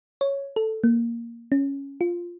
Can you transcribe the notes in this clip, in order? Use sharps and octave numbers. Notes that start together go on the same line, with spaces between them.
C#5
A4
A#3
C#4
F4